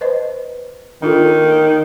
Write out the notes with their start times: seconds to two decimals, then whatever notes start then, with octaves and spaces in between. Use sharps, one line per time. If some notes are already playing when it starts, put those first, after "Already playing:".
0.01 B4 C5 D#5
1.02 D#3 D4 F4 A4